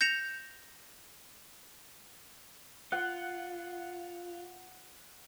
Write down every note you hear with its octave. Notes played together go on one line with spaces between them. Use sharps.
G6 A#6 C#7 E7 F7
F4 F#5